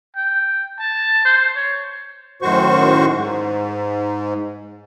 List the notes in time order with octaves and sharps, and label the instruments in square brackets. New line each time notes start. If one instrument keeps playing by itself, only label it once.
[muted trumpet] G5
A5
C5
C#5
[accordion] F#2 A2 D#3 F#4 C5 C#6
G#2